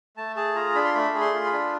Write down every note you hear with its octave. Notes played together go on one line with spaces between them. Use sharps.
A3 A5
G#4 A5
F4 A#5
D4 B5
C6
A3 B5
G#4
C6
F4
B5
D4